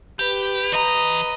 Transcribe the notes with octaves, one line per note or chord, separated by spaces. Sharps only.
G4 B4
E3 D#5 A#5